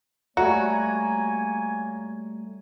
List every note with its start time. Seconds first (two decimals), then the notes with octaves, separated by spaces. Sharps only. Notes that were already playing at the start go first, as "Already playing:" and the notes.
0.37 G3 A3 A#3 F#4 C#5 G#5 A#5